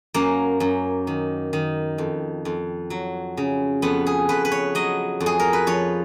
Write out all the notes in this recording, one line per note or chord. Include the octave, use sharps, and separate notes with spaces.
F#2 A#3
F#2
D#3
D#3
F2
F2
F#3
C#3
F2 B3
G#4
F2 B4
B4
C#5
F#3 D#5
F2
G#4
A#4
B4
F3 C#5